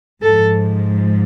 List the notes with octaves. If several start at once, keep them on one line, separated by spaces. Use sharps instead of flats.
G#2 F3 A4